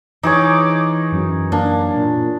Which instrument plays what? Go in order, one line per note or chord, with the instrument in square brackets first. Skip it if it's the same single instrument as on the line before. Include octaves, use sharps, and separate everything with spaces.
[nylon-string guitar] E3 [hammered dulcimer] D#4 G#4 C#5 [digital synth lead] D6
[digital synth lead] F#2
[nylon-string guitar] A#3 [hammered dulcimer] D4
[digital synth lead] A#2